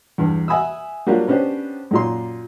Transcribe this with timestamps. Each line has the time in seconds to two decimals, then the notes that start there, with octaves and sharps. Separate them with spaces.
0.18 E2 G2
0.48 E5 F#5 G#5 B5 D#6 E6
1.07 F#3 G3 A#3 D4 F4 G4
1.28 B3 C#4 D4 G4 C5
1.91 F#2 A#2 C6